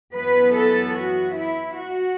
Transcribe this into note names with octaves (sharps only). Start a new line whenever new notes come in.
F#2 E3 B3 B4
A4
F#4
E4
F#4